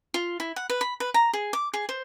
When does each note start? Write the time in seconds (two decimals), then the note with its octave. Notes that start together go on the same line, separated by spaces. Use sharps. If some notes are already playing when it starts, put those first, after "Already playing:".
0.14 F4
0.40 E4
0.56 F#5
0.70 B4
0.81 B5
1.00 B4
1.14 A#5
1.33 G#4
1.53 D6
1.74 G#4
1.89 C5